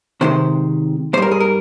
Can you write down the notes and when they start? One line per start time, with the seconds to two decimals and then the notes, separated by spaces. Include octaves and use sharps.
0.21 C3 D#3 G#3 C5
1.13 G#2 C5
1.18 G3 A#4
1.32 G#4
1.40 A#4